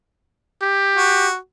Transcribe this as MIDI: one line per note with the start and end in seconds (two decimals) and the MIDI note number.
0.62 1.27 67
0.96 1.35 66